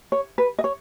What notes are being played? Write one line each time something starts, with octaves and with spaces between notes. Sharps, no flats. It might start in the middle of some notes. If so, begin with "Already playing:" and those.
C#5
B4
D#5
C#5